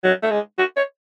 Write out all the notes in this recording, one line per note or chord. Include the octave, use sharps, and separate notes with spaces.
F#3
A3
G#3
F#4
C#5